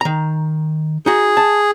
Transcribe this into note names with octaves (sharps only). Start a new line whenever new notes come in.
D#3 A#5
D#4 F#4 G#4
A5